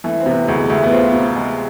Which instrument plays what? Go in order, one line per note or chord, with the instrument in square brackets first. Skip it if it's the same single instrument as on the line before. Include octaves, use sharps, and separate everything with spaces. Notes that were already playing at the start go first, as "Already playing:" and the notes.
[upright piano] E3 [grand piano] A3
[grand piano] C4
[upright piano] C3 [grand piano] B3
[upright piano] D2 [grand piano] G#3
[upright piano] D2 [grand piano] A3
[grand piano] B3
[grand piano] C4 [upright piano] F4
[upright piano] C3
G#3